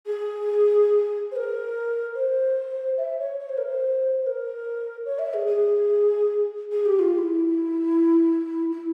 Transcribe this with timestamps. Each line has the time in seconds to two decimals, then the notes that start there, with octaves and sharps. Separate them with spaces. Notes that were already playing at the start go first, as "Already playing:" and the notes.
0.07 G#4
1.32 C5
1.36 A#4
2.15 C5
2.98 E5
3.19 C#5
3.40 C#5
3.49 C5
3.58 A#4
3.67 C5
4.22 C5
4.26 A#4
5.05 C#5
5.19 E5
5.34 G#4
5.47 G#4
6.72 G#4
6.86 G4
6.99 F4
7.13 F4
7.18 E4
8.72 E4